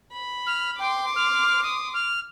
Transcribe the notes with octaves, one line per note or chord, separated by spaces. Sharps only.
B5
F6
G5 C6 D6
F6
D#6
F6